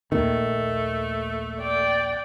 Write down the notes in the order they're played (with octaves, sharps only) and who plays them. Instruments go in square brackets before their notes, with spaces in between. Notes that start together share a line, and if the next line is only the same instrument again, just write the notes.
[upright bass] A#1 D#2 [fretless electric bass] D#3 [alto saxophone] A3
[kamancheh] D5 G5